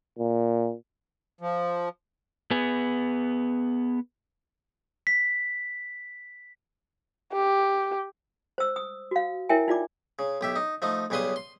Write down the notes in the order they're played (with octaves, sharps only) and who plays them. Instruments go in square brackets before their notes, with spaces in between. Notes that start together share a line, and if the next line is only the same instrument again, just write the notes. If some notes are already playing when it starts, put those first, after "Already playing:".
[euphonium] A#2
[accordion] F3
[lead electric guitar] B3 G#4
[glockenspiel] B6
[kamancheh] G4
[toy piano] C5 E6
D#6
F#4 F5
E4 A#4 C#5 E5 G5 G#5
D#4 F4 D5 D6
[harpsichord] C#3
B1 G4 E5
D#4
F3 A3 D#4
B1 C#3 G3 B4 C6 D#6
C6